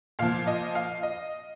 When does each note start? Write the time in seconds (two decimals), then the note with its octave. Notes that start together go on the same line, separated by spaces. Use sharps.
0.19 A#2 F3 F5
0.47 D#5
0.75 F5
1.03 D#5